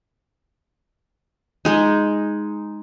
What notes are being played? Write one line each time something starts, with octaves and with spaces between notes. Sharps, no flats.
G#3 D#4